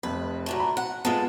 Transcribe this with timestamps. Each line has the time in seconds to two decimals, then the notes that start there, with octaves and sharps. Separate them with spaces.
0.03 F1 F2 B4
0.46 F#2 A#2 A3
0.60 B5
0.77 F#5
1.05 G#3 B3 F4 A4